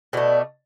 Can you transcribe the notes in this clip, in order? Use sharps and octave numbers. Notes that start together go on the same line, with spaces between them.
B2 A3 D5